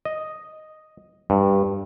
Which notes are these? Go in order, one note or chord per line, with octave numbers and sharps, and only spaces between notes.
D#5
G2